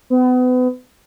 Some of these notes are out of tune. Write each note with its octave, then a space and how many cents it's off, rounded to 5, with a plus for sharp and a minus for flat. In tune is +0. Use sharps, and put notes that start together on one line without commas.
B3 +35